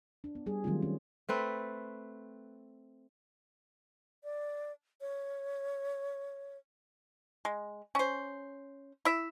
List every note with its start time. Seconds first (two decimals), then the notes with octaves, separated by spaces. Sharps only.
0.24 D4
0.35 B3
0.46 G3 G#4
0.64 D#3 F#3 G3 A3 C4 F4
0.82 C#4
1.29 A3 C4 B4
4.24 D5
5.01 C#5
7.45 G#3
7.95 C#4 C5
9.05 E4 E5